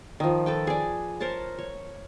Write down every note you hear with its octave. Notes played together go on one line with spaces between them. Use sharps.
D#3 F3
A4 B4 G5
G#4 D5
A#4 C5 C#5 A5
C#5